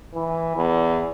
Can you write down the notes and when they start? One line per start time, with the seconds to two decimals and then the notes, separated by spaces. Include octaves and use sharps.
0.15 E3
0.56 E2